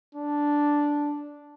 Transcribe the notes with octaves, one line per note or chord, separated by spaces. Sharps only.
D4